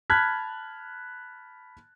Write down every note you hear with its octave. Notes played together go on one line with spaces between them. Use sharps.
A5 B5 F6 F#6 G#6 B6